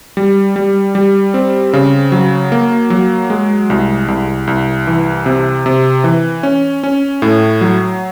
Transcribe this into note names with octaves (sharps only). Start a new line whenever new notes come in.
G3
G3
G3
C4
C#3
F#3
A#3
F#3
G#3
C2
C2
C2
E3
C3
C3
E3
C#4
C#4
A2
F#3